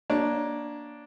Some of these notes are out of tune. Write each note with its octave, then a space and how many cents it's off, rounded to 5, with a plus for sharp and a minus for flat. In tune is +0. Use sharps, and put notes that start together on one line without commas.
A#3 +10 D4 +0 C#5 +0